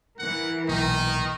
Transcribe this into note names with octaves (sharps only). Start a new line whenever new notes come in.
E3 A#4 F#5
B1 A#2 D#3 D#4